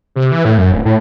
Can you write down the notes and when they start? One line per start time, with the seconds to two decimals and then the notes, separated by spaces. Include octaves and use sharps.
0.16 C3
0.32 E3
0.45 A2
0.58 F#2
0.72 D1
0.85 A2